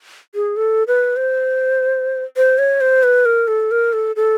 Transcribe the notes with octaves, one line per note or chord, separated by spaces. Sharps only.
G#4
A4
B4
C5
C5
C#5
C5
B4
A#4
A4
A#4
A4
A4